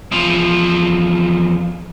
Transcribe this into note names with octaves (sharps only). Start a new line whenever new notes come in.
E2 F3